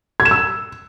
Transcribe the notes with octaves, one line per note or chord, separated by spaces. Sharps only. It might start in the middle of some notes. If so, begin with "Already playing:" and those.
G#6
E7
E6